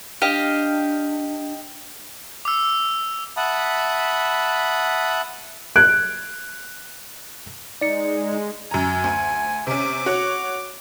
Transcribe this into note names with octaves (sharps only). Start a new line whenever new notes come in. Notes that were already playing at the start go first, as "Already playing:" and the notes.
D4 G4 D#5 F5
D6 E6
E5 F#5 A5 B5 D#6
F#6 G#6 D7
G#3 D#4 D5 C#7
F#2 G#5 A#5
D2
C3 C#4 D6
F#4 C#5